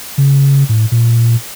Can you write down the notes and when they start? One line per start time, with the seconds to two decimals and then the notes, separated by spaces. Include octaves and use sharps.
0.18 C#3
0.69 A2
0.92 A#2